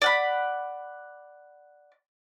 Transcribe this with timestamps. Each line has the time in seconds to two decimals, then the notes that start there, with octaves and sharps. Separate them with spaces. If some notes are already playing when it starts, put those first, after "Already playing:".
0.02 D5 F#5 B5